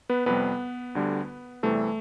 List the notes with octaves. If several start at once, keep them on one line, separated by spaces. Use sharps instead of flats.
B3 B4
F2 C3 G3 B3 B4
D2 D3 G3
E2 C3 E3 G3 A3 A4